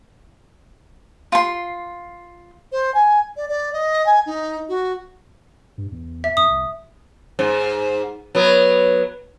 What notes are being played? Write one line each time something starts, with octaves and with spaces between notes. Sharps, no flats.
F4 C6
C5
G#5
D5
D5
D#5
G#5
D#4
F#4
G2
E2
E5
F2 D#6
C2
G#2
F#3 B3